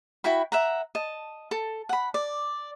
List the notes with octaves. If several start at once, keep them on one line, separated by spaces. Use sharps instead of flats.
E4 F#4 G5 B5
E5 F#5 A#5
D#5 A5
A4
F#5 B5
D5